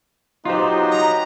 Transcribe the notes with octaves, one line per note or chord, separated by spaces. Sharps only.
F#3 B3 D#4 F4 G4 C5
A#5